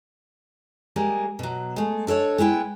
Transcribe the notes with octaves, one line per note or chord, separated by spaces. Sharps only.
G3 G#3 A#3 G#4
B2 F#3
G#3 A3
D4 A4 B4 C#5 D#5
G#3 B3 E4 G5